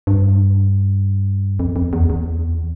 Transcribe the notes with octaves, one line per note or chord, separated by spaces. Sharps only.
G2
F2
F2
E2
E2